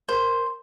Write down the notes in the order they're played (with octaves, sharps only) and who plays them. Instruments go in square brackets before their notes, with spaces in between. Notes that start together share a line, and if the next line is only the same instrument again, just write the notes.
[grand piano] A#4 [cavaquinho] C5